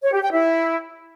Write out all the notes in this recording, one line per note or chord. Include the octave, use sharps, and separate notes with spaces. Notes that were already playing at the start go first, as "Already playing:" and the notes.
C#5
G4
G5
E4